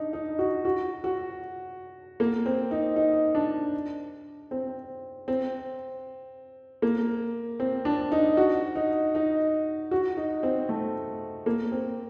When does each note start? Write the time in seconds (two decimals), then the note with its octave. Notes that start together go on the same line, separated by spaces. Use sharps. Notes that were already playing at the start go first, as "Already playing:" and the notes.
Already playing: D4 D#4
0.13 D#4
0.39 F#4
0.65 F#4
1.04 F#4
2.20 A#3
2.46 C4
2.71 D#4
2.96 D#4
3.35 D4
4.51 C4
5.28 C4
6.82 A#3
7.60 C4
7.85 D4
8.12 D#4
8.37 F#4
8.76 D#4
9.15 D#4
9.91 F#4
10.17 D#4
10.43 C4
10.69 A3
11.46 A#3
11.72 C4